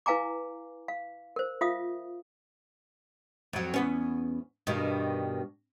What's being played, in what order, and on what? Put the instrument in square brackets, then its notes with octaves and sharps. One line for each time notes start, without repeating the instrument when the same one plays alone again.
[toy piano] E4 B4 F5 G#5 A#5 D6
F5
A#4 C5
F4 E5 F5 D#6
[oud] F2 F#3
E2 B3 C#4
G2 B2 D#3